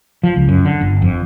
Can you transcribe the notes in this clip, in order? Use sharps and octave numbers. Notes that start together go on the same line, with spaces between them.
F3
C#2
F#2
D3
G1
F2